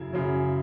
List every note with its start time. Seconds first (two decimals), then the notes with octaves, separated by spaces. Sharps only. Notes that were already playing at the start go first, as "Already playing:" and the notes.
Already playing: F#2 C#3 F#3 E4
0.13 F#2 C#3 F#3